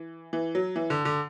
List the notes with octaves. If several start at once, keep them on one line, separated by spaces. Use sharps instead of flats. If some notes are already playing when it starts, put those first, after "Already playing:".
Already playing: E3
E3
F#3
E3
D3
D3